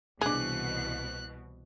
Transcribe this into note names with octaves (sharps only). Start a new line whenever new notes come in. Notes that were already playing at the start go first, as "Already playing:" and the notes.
C2 B2 E3 D4 G#4 F#6